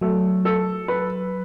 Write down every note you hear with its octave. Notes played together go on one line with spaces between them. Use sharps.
F#3 A3
A4
B4